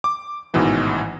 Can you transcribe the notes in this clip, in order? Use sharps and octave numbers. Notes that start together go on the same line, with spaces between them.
D6
A1 G#2 B2 D#3 E3 F#3